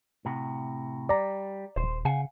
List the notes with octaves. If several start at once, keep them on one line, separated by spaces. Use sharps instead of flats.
A2 C3 F#4
G3 D5 A#5
D#1 C5
C#3 F5 F#5 G#5